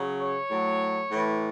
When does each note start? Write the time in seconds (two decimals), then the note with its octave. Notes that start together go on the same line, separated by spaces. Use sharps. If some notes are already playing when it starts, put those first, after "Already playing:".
Already playing: C#3 F#3
0.19 C#5
0.50 A2 F#3
1.11 A2 E3